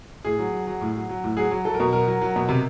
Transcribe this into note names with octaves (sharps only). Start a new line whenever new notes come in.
A2 G#4
F#3
F#3
F#3
A2
F#3
F#3
A2
F#3 G#4
F#3
F#3 A4
A#4
B2
F#3 A#4
F#3
F#3
B2
C3